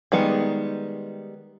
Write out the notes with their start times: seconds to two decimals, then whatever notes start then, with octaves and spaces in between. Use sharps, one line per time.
0.12 D#3 G3 G#3 B3